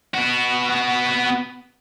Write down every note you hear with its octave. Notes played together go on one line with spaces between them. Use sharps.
B3 F#4